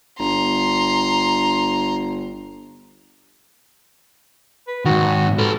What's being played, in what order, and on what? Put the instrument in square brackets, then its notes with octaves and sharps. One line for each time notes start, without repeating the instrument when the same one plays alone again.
[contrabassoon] G1 [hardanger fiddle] A#5 C6
[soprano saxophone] B4
[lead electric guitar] G#2 D#3 [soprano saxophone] F#4
[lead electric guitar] A4 B4